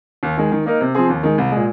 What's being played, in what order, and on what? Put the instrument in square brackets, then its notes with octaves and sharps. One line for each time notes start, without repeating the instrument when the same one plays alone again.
[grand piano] D#2
D#3 G#3
D#3
A#3 D#4 A#4
C3
F3 C4 G#4
D#2
D#3 G#3
C2
A#2 G#3